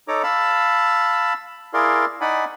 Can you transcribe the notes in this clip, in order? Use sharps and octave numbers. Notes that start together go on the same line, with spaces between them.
D#4 A4 C#5 A#5 D6
F5 A5 B5 E6
E4 G#4 A#4 D5 F5 C6
D#4 D5 F#5 G#5 B5